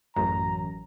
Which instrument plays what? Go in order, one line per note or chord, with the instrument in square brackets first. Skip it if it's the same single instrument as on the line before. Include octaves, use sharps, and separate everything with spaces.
[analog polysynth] A1 F#2 [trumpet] A#5